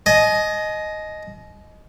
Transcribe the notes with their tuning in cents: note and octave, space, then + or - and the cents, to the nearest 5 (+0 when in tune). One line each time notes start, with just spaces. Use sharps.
D#5 +0 G#5 +45